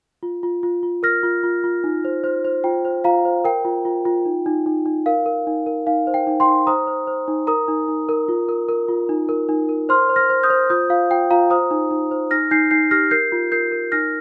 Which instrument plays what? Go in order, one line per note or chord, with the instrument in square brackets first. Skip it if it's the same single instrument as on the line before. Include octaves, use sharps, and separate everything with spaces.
[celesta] F4
F4
F4
F4
A#4 F6 A#6
F4
F4
F4
D#4
C5
C5
C5
F4 G5
C5
F4 F5 A#5
C5
A#4 G5
F4
F4
F4
D#4
D#4
D#4
D#4
A#4 F5
A#4
D#4
A#4
D#4 F5
C5
G5
D#4
G5 C6
D#4
C5 A#5 D#6
C5
C5
D#4
A#4 A#5 D#6
D#4
D#4
A#4
F4
A#4
A#4
F4
D#4
A#4
D#4
A#4
C5 C6 F6
C5
F6 A#6
C5
D#6 G6
C5
F4 D#6 G6
F4 F5
F4 G5
F4 F5 A#5
C5 A#5 D#6
D#4
D#4
C5
D#4 F6 A#6
D#4 G6 C7
D#4 G6 C7
G4 F6 A#6
A#4 G6 C7
F4
A#4 G6 C7
A#4
D#4 F6 A#6